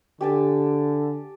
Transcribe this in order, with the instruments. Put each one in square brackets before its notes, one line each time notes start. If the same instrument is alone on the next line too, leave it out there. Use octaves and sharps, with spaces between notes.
[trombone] D3 [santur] G4 G#5 A5